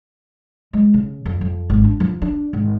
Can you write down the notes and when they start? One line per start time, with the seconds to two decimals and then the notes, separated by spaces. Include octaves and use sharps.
0.73 G#3
0.94 C#3
1.26 F2
1.41 F2
1.70 G#1
1.84 D4
2.00 F3
2.22 D4
2.53 G#1